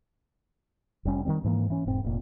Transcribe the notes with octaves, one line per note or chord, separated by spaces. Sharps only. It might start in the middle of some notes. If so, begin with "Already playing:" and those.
F1 G3 C#4
D#3 F3 G3 C4
G#2 E3 A#3
E3 C#4
E1 G#2 C4
F1 A#2